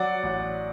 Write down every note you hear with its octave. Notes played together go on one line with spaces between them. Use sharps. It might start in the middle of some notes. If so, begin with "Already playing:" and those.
Already playing: F#3 D5 F#5
A1